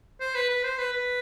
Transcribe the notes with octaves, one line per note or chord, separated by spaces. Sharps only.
C5
B4
B4
C5
B4
B4